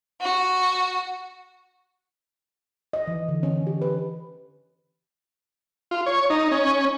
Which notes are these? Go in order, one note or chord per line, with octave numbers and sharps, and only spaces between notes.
F#4
D#5
E3
D3
C#4
G4
B4
F4
C#5
D#4
C#4